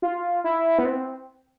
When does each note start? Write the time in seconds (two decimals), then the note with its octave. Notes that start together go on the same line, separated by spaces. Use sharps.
0.02 F4
0.44 E4
0.78 B3
0.85 C4